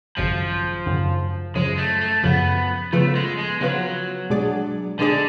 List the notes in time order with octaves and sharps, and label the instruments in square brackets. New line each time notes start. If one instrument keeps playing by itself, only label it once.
[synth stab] G#1 F#2 C#3 [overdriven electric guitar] F3
[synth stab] G#1 F#2 C#3
[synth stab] F#2 C#3 F3 [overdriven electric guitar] G#3
[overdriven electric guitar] A3
A3
[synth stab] F#2 C#3 F3 [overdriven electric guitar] B3
[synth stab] C#3 F3 B3 F4 B4 [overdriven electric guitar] A3
[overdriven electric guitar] G#3
G#3
[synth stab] C#3 F3 B3 F4 B4 [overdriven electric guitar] F#3
[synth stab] B2 G#3 D4 G#4 D5
[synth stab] B2 G#3 D4 G#4 D5 [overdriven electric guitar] D3